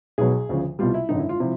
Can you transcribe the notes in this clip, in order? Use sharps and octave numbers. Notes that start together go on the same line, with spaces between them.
B1 B2 F#3 G#4
D2 C#3 F3
C2 B2 G3 F4
E4
G#1 F#2 D3 D#4
E4
F4
C3 F3 E4